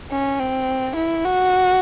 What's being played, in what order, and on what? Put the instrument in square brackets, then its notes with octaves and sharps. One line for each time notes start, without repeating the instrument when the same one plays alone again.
[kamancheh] C#4
C4
E4
F#4